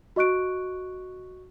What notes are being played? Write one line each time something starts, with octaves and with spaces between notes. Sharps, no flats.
F#4 D#5 C#6 F#6 D7